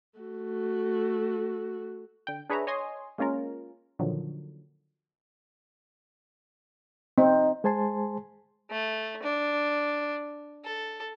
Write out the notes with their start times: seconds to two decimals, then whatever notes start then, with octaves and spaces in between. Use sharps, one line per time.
0.19 A3 F#4
2.27 D3 G5
2.50 D4 G#4 B4 C#5 E5 A#5
2.67 C#5 D#5 G#5 C6 D#6
3.18 G#3 A#3 C#4 F4 A#4
3.99 A#2 D3 D#3 F3 F#3
7.18 C4 D#4
7.64 G#3 G#4 C5 G#5 A5 C6
8.71 A3
9.22 D4
10.64 A4